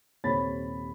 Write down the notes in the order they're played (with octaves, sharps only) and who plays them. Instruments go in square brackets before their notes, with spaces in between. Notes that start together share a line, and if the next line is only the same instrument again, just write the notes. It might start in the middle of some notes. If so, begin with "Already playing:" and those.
[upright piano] D#1 C3 C#5 B5 A6